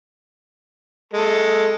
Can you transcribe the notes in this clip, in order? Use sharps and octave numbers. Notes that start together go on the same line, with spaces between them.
G#3 A4